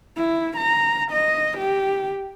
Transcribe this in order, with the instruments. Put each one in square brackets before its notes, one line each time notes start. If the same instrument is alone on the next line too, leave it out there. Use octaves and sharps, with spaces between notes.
[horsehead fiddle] E4
A#5
D#5
G4